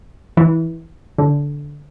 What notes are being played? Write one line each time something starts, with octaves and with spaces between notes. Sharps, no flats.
E3
D3